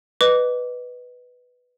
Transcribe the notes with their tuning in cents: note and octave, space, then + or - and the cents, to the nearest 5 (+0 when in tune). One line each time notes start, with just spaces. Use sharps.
B4 +0 D#5 -20 D6 -20